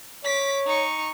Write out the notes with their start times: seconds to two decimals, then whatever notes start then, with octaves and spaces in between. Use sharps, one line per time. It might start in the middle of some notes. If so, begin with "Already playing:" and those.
0.25 C#5 D6 B6
0.67 D#4 C#6